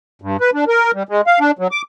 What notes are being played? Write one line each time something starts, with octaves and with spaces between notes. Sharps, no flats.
G2
B4
D4
A#4
G3
G#3
F5
D4
F#3
D6